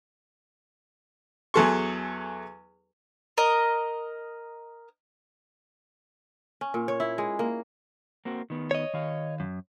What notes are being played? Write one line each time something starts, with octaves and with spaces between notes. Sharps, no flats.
E2 F#3 G#4 A4 C6 C#6
A#4 D#5
C#4
A#2
C#5
E4
G#3
A#3
A#3 C4 F#4
D#3 B3
C#5 D#5
D#3 F5
F#2